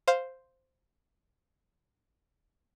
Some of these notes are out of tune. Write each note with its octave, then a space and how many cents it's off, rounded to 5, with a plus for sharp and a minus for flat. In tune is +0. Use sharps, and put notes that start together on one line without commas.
C5 +0 F5 +0